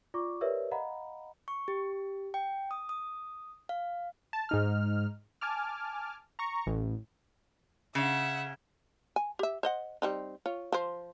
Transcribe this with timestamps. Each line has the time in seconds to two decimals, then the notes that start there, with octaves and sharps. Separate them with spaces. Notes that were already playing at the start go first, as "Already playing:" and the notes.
0.14 F4 D5 C#6 D6
0.41 G4 A#4 B4 C#5 D5 E5
0.71 D#5 F5 F#5 A#5 B5
1.48 C#6
1.68 G4
2.34 G5
2.71 D#6
2.89 D#6
3.69 F5
4.33 A5
4.49 G#2 D#4 F6
5.41 G#5 A5 D6 F6
6.39 A#5 C#6
6.66 A1
7.95 C#3 E5 F#5
9.16 G#5
9.39 G4 E5
9.63 C5 D#5 F#5
10.02 G3 C4 D#4
10.46 F4 C#5
10.72 F3 C5